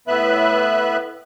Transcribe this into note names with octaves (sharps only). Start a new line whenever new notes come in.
A2 B3 B4 E5 F#6